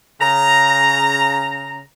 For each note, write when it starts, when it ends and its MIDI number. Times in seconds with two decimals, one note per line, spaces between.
0.21 1.81 49
0.21 1.81 82